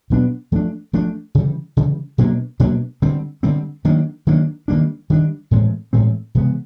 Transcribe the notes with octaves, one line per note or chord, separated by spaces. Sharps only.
B2 F#3 B3 D4
F3 A3 D4
F3 A3 D4
C#3 E3 G3
C#3 E3 G3
B2 F#3 A#3 D4
B2 F#3 A#3 D4
D3 G3 C4
D3 G3 C4
D#3 F#3 A#3 D4
D#3 F#3 A#3 D4
D#3 G3 A#3 D4
D#3 G3 A#3 D4
A2 E3 G#3 C4
A2 E3 G#3 C4
C3 E3 G#3 B3